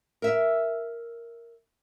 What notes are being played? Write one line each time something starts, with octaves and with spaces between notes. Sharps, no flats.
A#4 E5